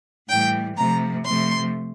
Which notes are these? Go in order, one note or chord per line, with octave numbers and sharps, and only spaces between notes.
A2 E3 G3 G5
C3 F3 A3 A#5
C3 F3 A3 C6